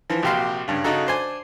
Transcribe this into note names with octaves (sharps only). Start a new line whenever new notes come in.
E3 F3
A#1 C3 F#4 G4 F5 C6
G2 C#3
C#3 D#4 F#4 A4 A#5
D4 C5 G#5